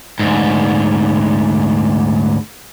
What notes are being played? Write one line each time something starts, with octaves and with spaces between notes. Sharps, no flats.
D2 G#2